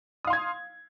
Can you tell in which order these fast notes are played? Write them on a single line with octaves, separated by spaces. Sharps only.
D#6 F5 C6 G#6